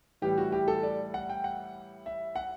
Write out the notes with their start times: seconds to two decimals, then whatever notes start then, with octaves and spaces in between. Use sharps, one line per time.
0.22 A2 E3 G3 G4
0.38 F#4
0.52 G4
0.68 A4
0.83 D5
1.14 F#5
1.29 G5
1.44 F#5
2.06 E5
2.36 F#5